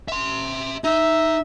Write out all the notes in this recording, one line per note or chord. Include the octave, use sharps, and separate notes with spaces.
E5 C6
D#4 E5